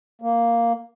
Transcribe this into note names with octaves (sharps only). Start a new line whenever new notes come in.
A#3